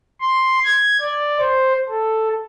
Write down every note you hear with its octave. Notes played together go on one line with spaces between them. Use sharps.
C6
G#6
D5
C5
A4